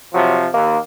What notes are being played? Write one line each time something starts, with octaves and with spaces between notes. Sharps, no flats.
C3 F3 F#3
D#2 A#3